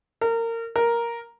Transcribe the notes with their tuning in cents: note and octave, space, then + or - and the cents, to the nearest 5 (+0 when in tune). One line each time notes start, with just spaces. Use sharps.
A#4 -25
A#4 +5